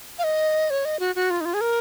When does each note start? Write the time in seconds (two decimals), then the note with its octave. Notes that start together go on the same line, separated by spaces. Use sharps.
0.19 F5
0.24 D#5
0.70 C#5
0.85 D#5
1.00 F#4
1.15 F#4
1.30 F4
1.41 D#4
1.45 F4
1.54 G#4
1.61 A#4